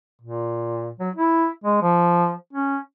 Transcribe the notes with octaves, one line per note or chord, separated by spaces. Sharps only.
A#2
F#3
E4
G#3
F3
C#4